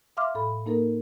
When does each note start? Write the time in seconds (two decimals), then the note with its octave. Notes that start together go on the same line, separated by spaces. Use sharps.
0.17 E5 F5 C6 D6 F6
0.35 A2 A4 B5
0.66 A#3 D#4 A4 A#4